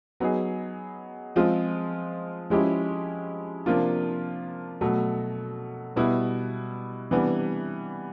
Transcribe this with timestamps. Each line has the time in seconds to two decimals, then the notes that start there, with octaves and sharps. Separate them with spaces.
0.20 F#3 B3 D#4 G#4
1.36 F3 G#3 C4 F4
2.50 F3 G#3 C#4 E4 G4
3.66 C3 F3 A#3 D4 F4
4.81 B2 F#3 A3
5.96 B2 G3 B3 E4
7.11 C3 E3 G3 B3 D4